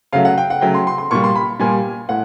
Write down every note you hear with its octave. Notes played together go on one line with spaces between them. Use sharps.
C#3 F#3 A3 F5
F#5
G5
F#5
C#3 F#3 A3 G5
C6
C6
C6
A#2 G3 C#6
C6
B5
A#2 G3 G#5
A2 F#5